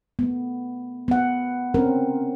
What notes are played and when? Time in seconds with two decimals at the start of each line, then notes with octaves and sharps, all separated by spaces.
0.19 A3 B3
1.08 B3 F#5
1.74 C4 C#4 A#4